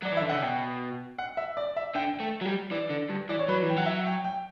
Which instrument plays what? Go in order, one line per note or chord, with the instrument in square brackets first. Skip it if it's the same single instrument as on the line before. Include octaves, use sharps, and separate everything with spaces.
[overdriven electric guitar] F#3 [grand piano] D5
[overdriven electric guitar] E3
[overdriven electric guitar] D3 [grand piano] E5
[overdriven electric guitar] C#3 [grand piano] F#5
[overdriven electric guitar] B2 [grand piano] G5
[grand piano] F#5
E5
D5
E5
[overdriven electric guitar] D3 [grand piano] G5
[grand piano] G5
[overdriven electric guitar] A3
F#3
G3
[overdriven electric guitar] E3 [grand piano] D5
[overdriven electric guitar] D3
G2
[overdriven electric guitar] E3 [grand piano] D5
[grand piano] C#5
[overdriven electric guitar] F#3 [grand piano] B4
[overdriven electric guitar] E3
[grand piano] G5
[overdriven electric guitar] F#3 [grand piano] F#5
[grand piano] E5
G5
G5